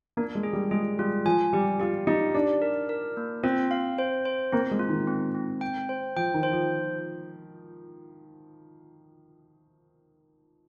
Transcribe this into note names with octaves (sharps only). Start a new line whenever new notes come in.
A#3 D4
G#3
G#4
G3
G#3 G#4
G3 F4
F3 G#5
G3 G4
F4 G4
D#4 G4
D4 D5
A#4
A#4
A#3
C4 F4
F5
C5
C5
A#3 C4
G#3
F4
D#3
C4
C4
G5
C5
F3 G5
D#3
C5
F3